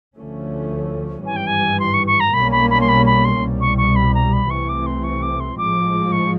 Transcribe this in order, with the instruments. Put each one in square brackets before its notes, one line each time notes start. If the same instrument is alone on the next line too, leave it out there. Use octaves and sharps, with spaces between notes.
[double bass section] D2 D3 F3 A3 C#4
[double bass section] G#1 G2 E3 G3 [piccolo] G#5
[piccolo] G5
G#5
C6
C#6
C#6
A#5
[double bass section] B1 B2 G3 A#3 C#4 [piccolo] B5
[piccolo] B5
B5
C6
B5
B5
C6
[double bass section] C2 B2 G3
[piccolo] C#6
C#6
B5
A#5
B5
[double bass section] C2 C3 E3 A3 C4 [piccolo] C#6
[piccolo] D6
C6
C#6
D6
C6
[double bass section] A1 G#2 F3 G#3 [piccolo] D6
[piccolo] C#6